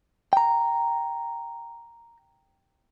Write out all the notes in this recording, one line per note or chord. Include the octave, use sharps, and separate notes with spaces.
G5 A#5